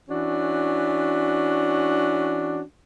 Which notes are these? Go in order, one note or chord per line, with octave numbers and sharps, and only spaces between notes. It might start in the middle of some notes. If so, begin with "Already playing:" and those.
E3 C#4 D4 F#4